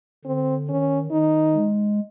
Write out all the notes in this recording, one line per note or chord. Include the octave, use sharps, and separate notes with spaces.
D3 C4
D#3 C#4
D#3 D#4
G#3